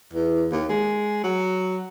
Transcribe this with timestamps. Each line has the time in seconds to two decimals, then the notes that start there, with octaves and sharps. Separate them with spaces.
0.13 E2
0.52 D#2
0.69 G#3
1.23 F#3